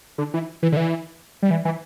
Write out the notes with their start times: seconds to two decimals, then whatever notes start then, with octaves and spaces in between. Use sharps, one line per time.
0.18 D3
0.34 E3
0.63 E3
0.72 D3
0.77 E3
1.43 G3
1.51 E3
1.65 E3